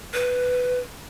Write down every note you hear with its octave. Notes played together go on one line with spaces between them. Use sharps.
B4